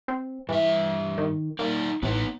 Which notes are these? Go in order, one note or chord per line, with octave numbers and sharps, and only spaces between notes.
C4
G2 E3 E5
D#3
A#3 D#4 A#4 D5
A1 B3 D#4 B4